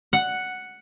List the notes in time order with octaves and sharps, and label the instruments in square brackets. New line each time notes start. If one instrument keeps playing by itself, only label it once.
[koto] F#5